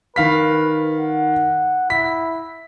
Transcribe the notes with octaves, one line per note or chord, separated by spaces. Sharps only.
D#3 B4 F5 B6
F#5
E4 B6